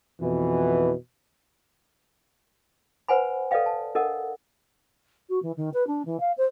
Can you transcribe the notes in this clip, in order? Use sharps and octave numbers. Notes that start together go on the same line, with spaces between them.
F2 B2 E3
B4 C5 F#5 G#5 B5
A4 B4 D5 D#5 F5 G5
A5
D4 A4 A#4 D#5 F#5
F#4
E3
D#3
B4
D4
E3
F5
C5